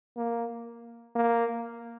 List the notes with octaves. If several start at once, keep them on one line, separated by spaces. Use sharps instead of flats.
A#3
A#3